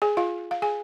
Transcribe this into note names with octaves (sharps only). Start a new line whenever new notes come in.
G#4 G#5
F4 F5
F5
G#4 G#5